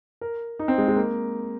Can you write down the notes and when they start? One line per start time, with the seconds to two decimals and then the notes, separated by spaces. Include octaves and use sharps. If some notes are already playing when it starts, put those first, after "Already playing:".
0.21 A#4
0.59 D#4
0.68 C4
0.78 G#3
0.88 G#3
0.96 A#3